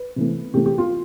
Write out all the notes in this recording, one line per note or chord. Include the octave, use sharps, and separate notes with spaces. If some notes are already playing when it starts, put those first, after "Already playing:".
Already playing: B4
C3 E3 A3
C3 E3 A3 G4
G4
F4